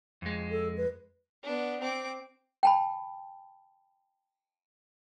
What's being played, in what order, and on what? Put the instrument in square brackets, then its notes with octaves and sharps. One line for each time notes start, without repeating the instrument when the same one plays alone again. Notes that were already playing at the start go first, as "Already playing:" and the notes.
[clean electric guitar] F2 G#3
[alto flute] A4
B4
[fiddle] B3 D4
C4 D6
[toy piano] G5 A5 B5